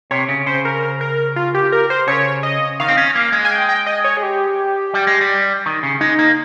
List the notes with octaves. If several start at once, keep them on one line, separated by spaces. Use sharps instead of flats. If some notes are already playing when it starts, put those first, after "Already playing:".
C3 C#5
C#3
C#3 C5
A#4
A#4
F4
G4
A#4
C5
C#3 C#5
D#5
D#3 F5
C4
C#4
A#3
G#3
G#5
G5
G5
D#5
C#5
G#4
G4
G3
G#3
G3
D#3
C#3
G#3 D#4
A#3